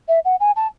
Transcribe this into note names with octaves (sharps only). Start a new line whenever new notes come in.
E5
F#5
G#5
A5